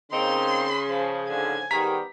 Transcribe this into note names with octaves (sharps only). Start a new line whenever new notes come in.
C#3 A#3 C4 D#4 C6
F3
G#2 D3 F3 G#5
G#2 D#3 G3 B3 G4 A#5 B6